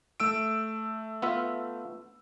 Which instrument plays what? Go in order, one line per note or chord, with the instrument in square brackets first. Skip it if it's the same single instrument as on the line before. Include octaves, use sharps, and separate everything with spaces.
[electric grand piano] A3 E6 D7
[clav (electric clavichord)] B3 F4 E5